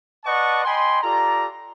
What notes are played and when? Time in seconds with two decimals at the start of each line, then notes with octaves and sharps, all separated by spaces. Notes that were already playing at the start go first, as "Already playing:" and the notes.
0.25 B4 D5 D#5 F#5 A5 C#6
0.64 D#5 G5 G#5 B5 C6
1.02 F4 G4 A4 D5 A#5